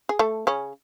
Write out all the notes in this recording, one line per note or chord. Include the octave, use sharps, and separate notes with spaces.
G#4
A3 A4
C#3 C#4